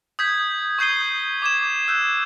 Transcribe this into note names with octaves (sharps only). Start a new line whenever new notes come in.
D#6 G6 G#6 B6
C#6 D#6 G6 C7 D#7 G7
D6 G#6 E7
E6 F#6 G6